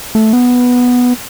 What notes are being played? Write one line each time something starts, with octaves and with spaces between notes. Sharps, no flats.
A3
B3